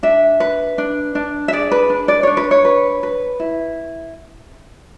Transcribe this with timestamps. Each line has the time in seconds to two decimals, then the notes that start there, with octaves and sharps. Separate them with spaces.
0.03 D4 E5
0.40 B4
0.78 D4
1.15 D4
1.48 E5
1.53 G#4 D5
1.71 B4
1.90 D4
2.08 D5
2.23 D4 C#5
2.37 B4
2.51 C#5
2.65 B4
3.03 B4
3.40 E4